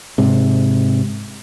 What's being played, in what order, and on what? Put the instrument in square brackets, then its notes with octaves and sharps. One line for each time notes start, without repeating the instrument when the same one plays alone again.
[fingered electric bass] G#2 C3